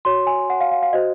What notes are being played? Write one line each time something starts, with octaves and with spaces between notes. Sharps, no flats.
F#4 C#5 C6
G#5
F#5
F5
F5
F5
F#4 C5 D#5